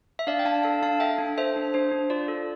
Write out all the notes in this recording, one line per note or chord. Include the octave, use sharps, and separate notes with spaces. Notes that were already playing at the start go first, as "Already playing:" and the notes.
E5
D4 D5 F5
G5
D4 F5 A5
A4 F5 A5
D4 F5 A5
A4 E5 G5
D4
A4 C5 E5
D4
D4 C5
D4
F4 D5
A4